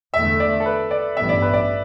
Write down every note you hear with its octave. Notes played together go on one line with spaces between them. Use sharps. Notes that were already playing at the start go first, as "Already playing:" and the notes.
E2 D3 A3 E5
D5
A4
B4
D5
A1 G2 E3 G3 B3 E5
D5
B4
D5